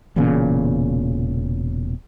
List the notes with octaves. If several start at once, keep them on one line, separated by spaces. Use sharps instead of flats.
E1 E2 A#2 C#3